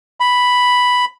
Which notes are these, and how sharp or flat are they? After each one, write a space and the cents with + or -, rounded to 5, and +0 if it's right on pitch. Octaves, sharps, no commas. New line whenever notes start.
B5 +0